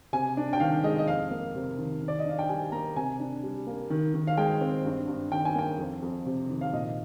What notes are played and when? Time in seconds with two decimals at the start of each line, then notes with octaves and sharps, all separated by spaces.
0.13 C3 G#5
0.37 D4
0.53 G5
0.60 D#3 F5
0.84 G#3 D#5
0.99 D#5
1.08 F2 F5
1.31 A#3
1.55 C3
1.78 D#3
2.02 D#3
2.08 D5
2.19 D#5
2.25 D4 F5
2.39 G5
2.49 G3 G#5
2.72 A#3 A#5
2.96 C3 G#5
3.20 D4
3.43 G3
3.67 A#3
3.90 D#3
4.14 D#3
4.27 F5
4.37 G#3 G5
4.61 C4
4.85 G2
5.08 G2
5.32 D#3 G5
5.45 G#5
5.55 A#3 G5
5.79 F2
6.02 F2
6.26 C3
6.50 D#3
6.61 F5
6.73 A#2 D#5